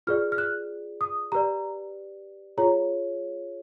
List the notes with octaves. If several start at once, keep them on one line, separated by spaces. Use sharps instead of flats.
F4 G#4 B4 D5 F6
F6
F#6
D#6
G4 B4 D5 A#5
F4 G#4 C#5 A#5